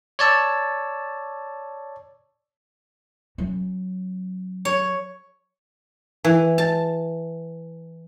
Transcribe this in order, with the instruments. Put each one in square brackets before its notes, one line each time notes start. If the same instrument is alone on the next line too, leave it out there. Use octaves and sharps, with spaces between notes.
[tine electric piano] C#5 D5 A5 E6
[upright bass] F#3 C#4
[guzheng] C#5
E3
A5